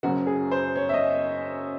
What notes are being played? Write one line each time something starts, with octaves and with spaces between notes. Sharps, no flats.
F#1 F#2 C#3 F#4
G#4
C5
C#5
E5
D#5